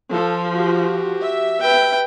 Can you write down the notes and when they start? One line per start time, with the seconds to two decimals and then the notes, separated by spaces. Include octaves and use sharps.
0.11 F3 A4
0.53 F#4 G4
1.22 E5
1.60 B4 G5